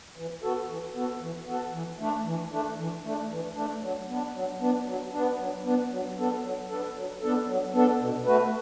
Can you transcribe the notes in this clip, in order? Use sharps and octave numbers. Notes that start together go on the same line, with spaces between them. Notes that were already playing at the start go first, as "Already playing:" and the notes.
E3
B3 F#4 A4
E3
B3 F#4 A4
E3
B3 F#4 A4
E3
A3 D4
E3
A3 D4
E3
A3 D4
E3
A3 D4
F#3
B3 D4
F#3
B3 D4
F#3
B3 D4
F#3
B3 D4
F#3
B3 D4 A4
F#3
B3 D4 A4
F#3
B3 D4 A4
F#3
B3 D4 A4
B2
A3 F#4 B4